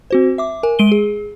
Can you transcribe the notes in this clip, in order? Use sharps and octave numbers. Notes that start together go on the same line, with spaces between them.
C4 F#4 C5
E5 D6
A#4 G#5
G#3 D7 D#7 G7
G#4